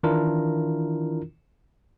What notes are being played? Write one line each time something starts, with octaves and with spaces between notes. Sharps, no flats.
D#3 E3 D4 E4 F4 A#4